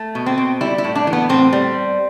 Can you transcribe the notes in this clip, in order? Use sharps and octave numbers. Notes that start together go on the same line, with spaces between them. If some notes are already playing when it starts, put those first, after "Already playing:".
Already playing: A3
B2
C4
B2
G3 E4
E4
A2
D4
E3
B3
A2 C4
G3